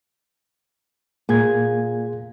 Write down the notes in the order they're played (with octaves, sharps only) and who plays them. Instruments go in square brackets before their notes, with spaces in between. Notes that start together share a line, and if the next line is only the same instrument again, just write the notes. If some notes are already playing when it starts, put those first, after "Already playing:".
[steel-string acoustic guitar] A#2 [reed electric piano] A#3 G#4 G#6